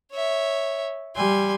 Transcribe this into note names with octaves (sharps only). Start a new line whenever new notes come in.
C#5 E5
G3 G#5 C6